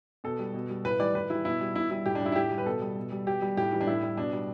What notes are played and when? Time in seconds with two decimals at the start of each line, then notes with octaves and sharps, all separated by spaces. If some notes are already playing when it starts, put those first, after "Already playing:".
0.24 B2 A4
0.39 G3
0.54 B2
0.70 G3
0.85 A2 B4
1.00 E3 G3 D5
1.15 A2 B4
1.30 E3 G3 E4
1.45 B2 E4
1.61 G3
1.75 B2 E4
1.90 G3 E4
2.06 A2 G4
2.15 D4
2.21 G3 E4
2.32 E4
2.36 A2 G4
2.51 G3
2.58 B4
2.66 B2 A4
2.82 G3
2.97 B2
3.12 G3
3.27 B2 G4
3.42 G3
3.57 A2 G4
3.72 E3 G3
3.81 D4
3.87 A2 E4
4.03 G3
4.17 B2 D4
4.33 G3